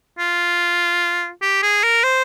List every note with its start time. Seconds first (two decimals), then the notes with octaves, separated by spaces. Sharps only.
0.19 F4
1.42 G4
1.63 G#4
1.84 A#4
2.04 C5